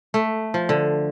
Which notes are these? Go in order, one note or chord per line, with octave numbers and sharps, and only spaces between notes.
A3
F3
D3